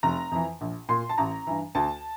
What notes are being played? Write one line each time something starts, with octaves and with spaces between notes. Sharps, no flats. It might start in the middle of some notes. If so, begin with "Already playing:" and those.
F1 A#5
F2 E3
A#1
A#2 C6
A5
A1 A#5
G2 E3
D2 A5